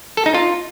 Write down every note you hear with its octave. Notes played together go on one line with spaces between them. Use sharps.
A4
D#4
F4